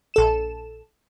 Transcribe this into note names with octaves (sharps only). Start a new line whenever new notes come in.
A#1 A4 E7